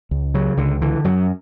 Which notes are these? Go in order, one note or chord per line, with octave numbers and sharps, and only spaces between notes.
C#2
C#3 F#3
C#2 D3
D3 E3
F#2 F#3